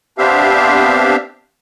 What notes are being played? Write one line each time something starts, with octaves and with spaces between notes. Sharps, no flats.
B3 C4 D4 G4 E5 F5